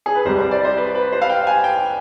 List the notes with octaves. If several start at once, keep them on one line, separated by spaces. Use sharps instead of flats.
G#4
B4
C2 C3 G3 C5
C5
D5
C5
B4
B4
C5
F5
G5
G#5
G5